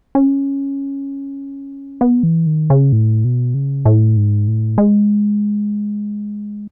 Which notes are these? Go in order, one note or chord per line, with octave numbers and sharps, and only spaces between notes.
C#4
B3
E3
D#3
C#3
A2
B2
C#3
A2
G#2
A2
G#3